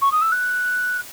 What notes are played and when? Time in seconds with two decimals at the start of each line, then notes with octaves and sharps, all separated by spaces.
0.01 C#6
0.11 D#6
0.21 E6
0.32 F#6